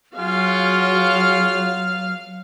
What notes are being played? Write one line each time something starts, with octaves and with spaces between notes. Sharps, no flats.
F#3 F4 F#4 G#4 F5